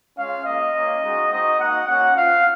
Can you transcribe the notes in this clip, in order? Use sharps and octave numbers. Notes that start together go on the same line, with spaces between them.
G#3 C#4 F4 F5
A#3 F4 D#5
A#3 C#4 F4
G#3 D#4 F#4
C4 D#4 F#4 D#5
A#3 D#4 F#4 F#5
A#3 C#4 F#4 F#5
C4 F4 F5